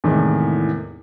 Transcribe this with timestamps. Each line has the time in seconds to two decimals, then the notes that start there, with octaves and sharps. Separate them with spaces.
0.04 E2 A2 C3 D#3 E3 G#3